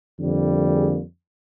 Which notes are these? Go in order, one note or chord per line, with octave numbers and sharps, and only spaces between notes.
F2 D3 G3 A#3
G#4